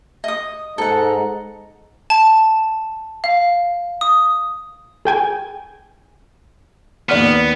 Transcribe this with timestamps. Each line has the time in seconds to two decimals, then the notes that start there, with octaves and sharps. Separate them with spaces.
0.24 D#5 D#6
0.78 G#2 A4 F#5 A#5
2.10 A5
3.24 F5
4.01 D#6
5.05 G#4 G5 G#5
7.09 D#2 B3 D5 F6